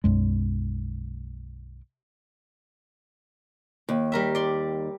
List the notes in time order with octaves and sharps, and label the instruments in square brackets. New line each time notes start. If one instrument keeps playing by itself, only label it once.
[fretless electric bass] B1 F#2 G#3
[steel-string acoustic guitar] D#2
[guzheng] G3 A#4 E5
D5 C6